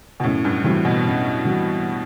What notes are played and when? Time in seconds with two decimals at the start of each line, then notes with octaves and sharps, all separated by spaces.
0.20 B2
0.23 F#2 A2
0.45 G2
0.64 A2 E3 G3 C4 F#4
0.85 B2
1.05 F#2
1.45 E3 G3 C4 F#4